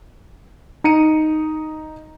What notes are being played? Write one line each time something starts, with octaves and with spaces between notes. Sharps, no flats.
D#4 A#5 C#7 D#7